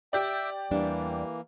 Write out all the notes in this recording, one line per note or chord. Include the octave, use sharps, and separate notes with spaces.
G4 D5 E5 G5
E2 E3 G3 A#3 D4